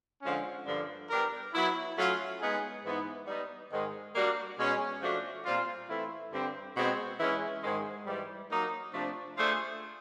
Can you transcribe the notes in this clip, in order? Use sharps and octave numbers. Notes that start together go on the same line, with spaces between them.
D3 F3 G#3 C#4
G2 D3 F3 A#3 D4
G3 B3 D4 G4 A#4
F#3 B3 E4
F#3 A3 C#4 F4
G#3 B3 D#4 G#4
G#2 E3 G#3 B3 D#4
G3 B3 D#4
G#2 D#3 G#3
G3 A#3 D4 F#4 A#4
B2 G#3 C#4
F3 A3 D4 F#4
A#2 G3 C4 F4
E3 A3 C4 E4
G2 D3 G3 C4
B2 G#3 C4
E3 G#3 C#4
G#2 D#3 G#3
G#2 E3 G3
F#3 A#3 D#4
C3 F3 A3 D4
A3 D4 F4 G#4 C5